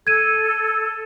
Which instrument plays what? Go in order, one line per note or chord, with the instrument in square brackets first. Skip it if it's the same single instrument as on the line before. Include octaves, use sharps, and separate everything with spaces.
[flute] A4 [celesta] G#6 D#7